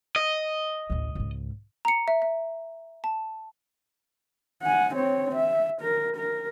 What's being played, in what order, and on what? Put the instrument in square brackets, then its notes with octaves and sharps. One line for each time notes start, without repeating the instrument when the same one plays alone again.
[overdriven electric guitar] D#5
[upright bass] A1 D2
C#2 G#2
[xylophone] A#5 C#7
E5
E5
A5
[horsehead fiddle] F#5 G#5
C4 C#5
E5
A#4
A#4